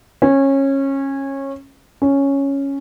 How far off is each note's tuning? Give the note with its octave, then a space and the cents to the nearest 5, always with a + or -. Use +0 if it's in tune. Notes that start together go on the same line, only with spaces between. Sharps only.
C#4 -20
C#4 +0